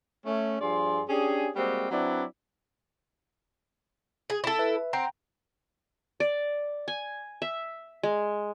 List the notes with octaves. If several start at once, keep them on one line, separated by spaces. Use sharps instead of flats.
A3 C#4
G2 F3 G#4 D5 C6
C#4 D4 G4 G#4
G3 G#3 A#3 C4 F#4 G4
F#3 C4 D4 E4 B4 D5
G#4
E4 A4
B4 E5
C4 F#5 G5 A#5
D5
G#5
E5
G#3